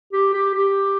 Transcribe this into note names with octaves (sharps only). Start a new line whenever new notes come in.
G4
G4
G4